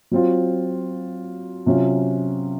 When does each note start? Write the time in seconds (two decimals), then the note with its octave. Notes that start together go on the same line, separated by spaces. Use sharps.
0.11 F#3 C4 F4
1.66 C3 F#3 C#4 F4